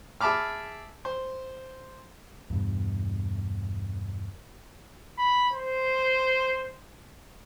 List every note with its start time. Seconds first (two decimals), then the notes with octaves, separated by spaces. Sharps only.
0.21 G#4 E5 A5 B5 D6 F6
1.05 C5
2.50 E2 G2 B2
5.18 B5
5.53 C5